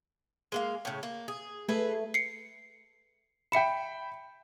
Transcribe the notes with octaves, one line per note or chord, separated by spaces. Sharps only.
G#3 A#3 F5
A2 C#3
A#3
G#4
A3 G#4 A4 B4
C7 C#7
E5 G5 B5 C#7 E7